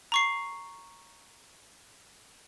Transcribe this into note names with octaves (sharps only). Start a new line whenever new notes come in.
A#5 C#6 C7